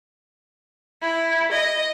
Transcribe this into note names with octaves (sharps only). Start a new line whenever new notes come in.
E4
D#5